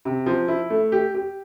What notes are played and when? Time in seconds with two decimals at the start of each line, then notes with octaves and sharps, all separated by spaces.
0.05 C3
0.26 F3
0.48 E4
0.70 A3
0.92 G4
1.14 G4